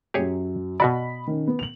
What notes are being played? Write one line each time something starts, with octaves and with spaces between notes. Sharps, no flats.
F#2 F#3 G4 G#4 C#5
B2 F#4 D5 D#5 B5
D#3 C#4
B3
F7 F#7